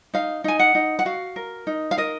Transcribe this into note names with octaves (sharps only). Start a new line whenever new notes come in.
D#4 F5
D#4 G#5
F#5
D#4
F#5
F#4 F5
A#4
D#4
F5
A#4 D#5